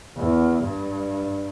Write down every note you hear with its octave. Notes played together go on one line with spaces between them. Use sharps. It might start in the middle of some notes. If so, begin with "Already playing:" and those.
E2
G2